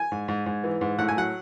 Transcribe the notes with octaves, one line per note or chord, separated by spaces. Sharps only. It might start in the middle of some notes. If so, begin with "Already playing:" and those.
Already playing: G#5
G#2
G#2
G#2
E3
G#2
A2 F#5
G#5
F#3 F#5